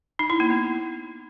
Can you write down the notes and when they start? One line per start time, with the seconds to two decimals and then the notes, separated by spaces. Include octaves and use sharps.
0.19 D#4
0.30 E4
0.40 A#3
0.50 B3